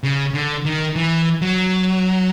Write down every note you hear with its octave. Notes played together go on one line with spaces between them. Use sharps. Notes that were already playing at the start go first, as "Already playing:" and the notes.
C#3
D3
D#3
E3
F#3